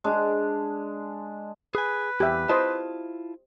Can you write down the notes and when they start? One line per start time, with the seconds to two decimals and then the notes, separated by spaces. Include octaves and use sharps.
0.04 G#3 D4
1.75 G#4 B4 G#5
2.20 E2 G4 E5
2.49 E4 F4 C5 D#5 A5